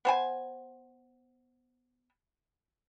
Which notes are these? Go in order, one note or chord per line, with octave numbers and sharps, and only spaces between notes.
B3 C5 G#5